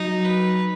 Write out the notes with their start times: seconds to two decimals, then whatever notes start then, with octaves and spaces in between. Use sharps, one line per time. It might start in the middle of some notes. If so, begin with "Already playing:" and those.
Already playing: F#3 D#4
0.25 B4